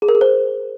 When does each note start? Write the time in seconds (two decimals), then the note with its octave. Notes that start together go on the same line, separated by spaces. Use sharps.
0.02 G#4
0.09 A#4
0.15 G#4
0.21 C5